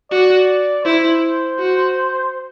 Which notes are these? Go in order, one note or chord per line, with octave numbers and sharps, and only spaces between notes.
F#4 D5
E4 C5
F#4